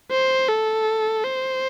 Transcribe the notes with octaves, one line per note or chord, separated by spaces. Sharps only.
C5
A4
C5